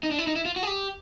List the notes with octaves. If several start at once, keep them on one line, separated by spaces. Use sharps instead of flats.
D#4
D4
E4
D#4
E4
F4
F#4
G#4
G4